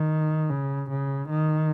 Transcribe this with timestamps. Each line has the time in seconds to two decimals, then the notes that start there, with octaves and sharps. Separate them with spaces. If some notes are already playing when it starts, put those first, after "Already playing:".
Already playing: D#3
0.50 C#3
0.90 C#3
1.30 D#3